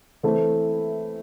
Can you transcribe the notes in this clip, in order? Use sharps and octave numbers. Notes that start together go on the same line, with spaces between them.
E3 A3 C4 E4